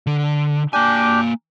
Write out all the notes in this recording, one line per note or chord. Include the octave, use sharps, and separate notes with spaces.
D3
A#3 D4 G4 G#5